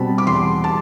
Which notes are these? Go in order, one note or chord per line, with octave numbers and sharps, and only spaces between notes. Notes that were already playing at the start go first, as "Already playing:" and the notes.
Already playing: B2 G3 C4 A5 B5
D6
E2 C6
A5